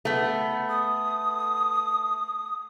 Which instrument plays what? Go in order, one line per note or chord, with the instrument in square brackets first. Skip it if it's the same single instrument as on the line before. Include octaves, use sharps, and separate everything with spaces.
[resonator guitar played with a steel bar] A3 B3
[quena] D#6